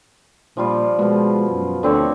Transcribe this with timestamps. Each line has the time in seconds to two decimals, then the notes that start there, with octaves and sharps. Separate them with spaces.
0.57 A#2 F3 G3 F4
0.99 B2 F3 G#3
1.51 F#2
1.83 D2 D3 C4 C#5